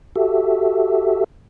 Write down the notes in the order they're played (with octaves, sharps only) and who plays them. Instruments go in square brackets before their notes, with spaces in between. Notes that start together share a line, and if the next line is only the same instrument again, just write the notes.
[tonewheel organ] F#4 G4 A4 E5